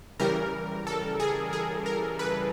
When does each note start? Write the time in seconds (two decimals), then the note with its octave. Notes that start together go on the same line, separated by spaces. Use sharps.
0.20 C#3 E3 G3 A#4
0.87 A4
1.20 G#4
1.53 G#4
1.86 A#4
2.19 B4